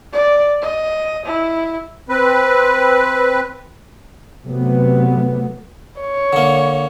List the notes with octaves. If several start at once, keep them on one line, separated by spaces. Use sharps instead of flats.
D5
D#5
E4
C4 B4
C3 F#3 A3 B3
C#5
D3 A#3